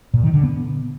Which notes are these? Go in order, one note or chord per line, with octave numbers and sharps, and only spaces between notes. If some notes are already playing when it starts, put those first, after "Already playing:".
A#2
D#3
D3
B3